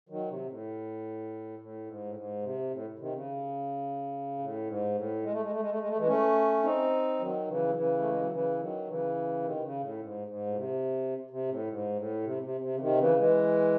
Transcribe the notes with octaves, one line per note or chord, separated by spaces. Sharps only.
D#3 F#3
C3
A2
A2
G#2
A2
G#2
C3
A2
C3 D#3
C#3
A2
G#2
A2
G#3
A3
G#3
A3
G#3
A3
G#3
A3
E3 G#3
A3 C#4
C4 D#4
D#3 F#3
C#3 E3
F#3
C#3 E3
A3
G#3
F#3
C#3 E3
D#3 F#3
C#3 E3
C3 D#3
C3
C#3
A2
G#2
G#2
A2
C3
C3
A2
G#2
A2
C3
C3
C3
C#3
C3 D#3
C#3 E3
E3 G#3